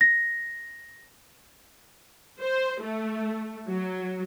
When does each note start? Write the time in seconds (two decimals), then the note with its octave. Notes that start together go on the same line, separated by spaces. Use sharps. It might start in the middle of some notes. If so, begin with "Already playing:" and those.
0.01 A#6
2.39 C5
2.81 A3
3.68 F#3